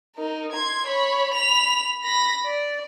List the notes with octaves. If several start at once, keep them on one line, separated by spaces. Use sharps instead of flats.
D#4 A#4
C6 G#6
C#5 B5
B5 F7
B5 A#6
D5